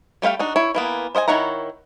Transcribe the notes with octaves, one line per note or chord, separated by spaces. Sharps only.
G3 A3 C5 F5 G5
D4 D#4 F#4
E4 C#5
E3 A#3 B3
C5 D#5 F#5 G#5
D#3 E4 C#5 F#5 A#5